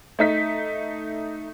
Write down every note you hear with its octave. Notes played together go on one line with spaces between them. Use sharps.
A3 D#4 B6